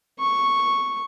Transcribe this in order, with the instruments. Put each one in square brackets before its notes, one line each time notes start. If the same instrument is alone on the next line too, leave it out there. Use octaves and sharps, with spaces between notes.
[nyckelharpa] C#6